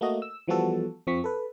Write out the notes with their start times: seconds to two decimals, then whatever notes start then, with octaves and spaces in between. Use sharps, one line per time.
0.01 A3 A#3 F#4 D#5
0.22 E6
0.48 E3 F3 G3 B3 F#4 A4
1.07 F2 F3 C4 C#6 B6
1.24 A4 B4